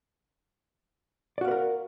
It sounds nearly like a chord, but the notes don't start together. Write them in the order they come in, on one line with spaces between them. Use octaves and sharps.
D5 F#4 F5 B4 A#4